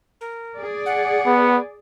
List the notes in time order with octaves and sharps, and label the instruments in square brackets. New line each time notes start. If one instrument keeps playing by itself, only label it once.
[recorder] A#4
[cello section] G#4 D5
[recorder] F#5
[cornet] B3